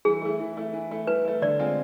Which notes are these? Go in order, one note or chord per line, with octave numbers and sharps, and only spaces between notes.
E3 G#4
A3 E4
E3
A3 E4
E3
A3 E4
E3 B4
A3 E4
D3 D5
G#3 C4 F4